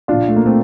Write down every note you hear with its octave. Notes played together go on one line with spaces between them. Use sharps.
A#2 F3 D4 F4
A3
A#3
A3 C4